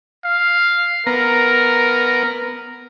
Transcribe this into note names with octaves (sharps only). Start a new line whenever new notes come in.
F5
B3 A#4 A#5